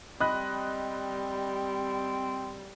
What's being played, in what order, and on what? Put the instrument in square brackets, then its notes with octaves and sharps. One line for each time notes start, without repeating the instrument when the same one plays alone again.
[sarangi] G3 [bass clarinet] C4 [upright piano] D#5 B5 F#6